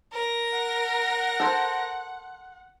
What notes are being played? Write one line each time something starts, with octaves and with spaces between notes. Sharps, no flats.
A#4 A#6
F#5
A4 C5